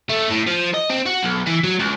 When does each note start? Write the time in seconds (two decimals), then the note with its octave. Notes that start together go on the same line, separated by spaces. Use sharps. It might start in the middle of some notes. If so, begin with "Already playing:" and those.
0.09 A3
0.30 A2
0.47 F3
0.74 D#5
0.90 C4
1.06 F#4
1.23 B1
1.46 E3
1.64 F#3
1.80 C#2